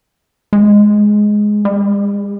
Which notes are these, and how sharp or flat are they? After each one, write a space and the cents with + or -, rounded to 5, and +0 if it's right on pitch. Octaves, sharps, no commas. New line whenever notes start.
G#3 +5
G#3 -45